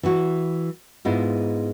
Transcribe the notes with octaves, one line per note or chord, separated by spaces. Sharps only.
E3 E4 F#4
G#2 G#3 B3 E4 F4